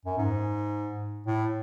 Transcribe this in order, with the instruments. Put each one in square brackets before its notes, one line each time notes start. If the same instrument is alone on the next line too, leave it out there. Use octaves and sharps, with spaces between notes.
[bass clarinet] F#2
G#2
A2